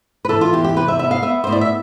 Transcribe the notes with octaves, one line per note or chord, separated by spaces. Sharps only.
B4
E3 A4
F4
E2 G4
G4
C3 B4
E5
B3 E5
F5
B3 E5
A2 C5
D5
E5